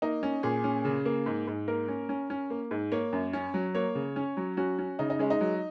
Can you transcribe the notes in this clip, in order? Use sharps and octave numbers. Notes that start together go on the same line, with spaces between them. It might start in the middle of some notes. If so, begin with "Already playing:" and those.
A#3 D#4
C#4
A#2 G#4
C#4
C#3
A#3
G#2
G#2
A#3 A#4
C#4
C#4
C#4
A#3
G#2
A#3 C#5
F#2
C#4
F#3
A#3 C#5
C#3
C#4
F#3
C#4 F#4
C#4
C#3 D#4
D#4
G#3 C#4
D#4
F#3